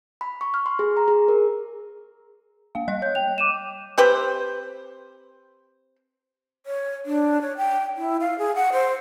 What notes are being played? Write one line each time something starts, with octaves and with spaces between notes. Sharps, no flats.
B5
C#6
F6
C6
G#4
A#5
G#4
A#4
A#3 F5
G3 D#5 F#6
C#5 G6
G5 F7
D6 D#7 E7
C4 G4 B4 C5
C#5
D4
C#5
G5
E4
F5
G#4
F#5
C5